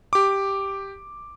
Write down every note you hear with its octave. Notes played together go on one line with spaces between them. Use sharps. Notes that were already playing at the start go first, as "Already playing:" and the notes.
G4 D6